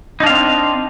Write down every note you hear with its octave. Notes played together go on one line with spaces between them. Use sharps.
C4 D4 D#4 F5